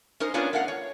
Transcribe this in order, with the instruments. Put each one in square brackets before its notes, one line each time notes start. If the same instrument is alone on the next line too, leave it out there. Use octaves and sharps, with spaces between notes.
[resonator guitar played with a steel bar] C#4 D#4 A#4 C5
B3 C#4 D4 F4 A#4
A3 A#4 F5 F#5
C#5